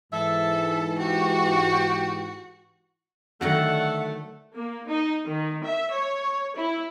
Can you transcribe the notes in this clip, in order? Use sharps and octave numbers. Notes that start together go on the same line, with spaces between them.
G#2 E3 A4 E5
F#4 G4
D3 D#3 F#3 A3 F#4 A4 F#5
A#3
D#4
D#3
E5
C#5
E4